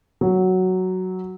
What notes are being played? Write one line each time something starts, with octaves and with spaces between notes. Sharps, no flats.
F#3